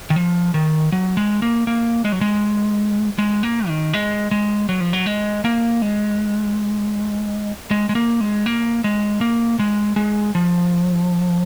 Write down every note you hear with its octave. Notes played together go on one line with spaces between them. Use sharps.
D#3
F3
D#3
F#3
G#3
A#3
A#3
G#3
F#3
G#3
G#3
A#3
D#3
G#3
G#3
F#3
F3
F#3
G#3
A#3
G#3
G#3
G#3
A#3
G#3
A#3
G#3
A#3
G#3
G#3
F3